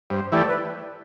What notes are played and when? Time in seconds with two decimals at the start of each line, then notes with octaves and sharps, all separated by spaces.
0.10 G2 C5
0.32 E3 A3 E4 G4 D5
0.48 B4